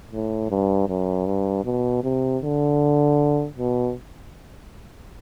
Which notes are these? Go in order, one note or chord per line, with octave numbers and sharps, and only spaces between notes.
A2
G2
F#2
G2
B2
C3
D3
B2